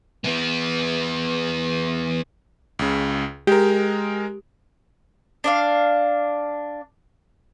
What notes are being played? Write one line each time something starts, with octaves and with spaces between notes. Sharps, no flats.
E3 B3
C#2 C#3
G#3 G4 A#4
D4 D5 F5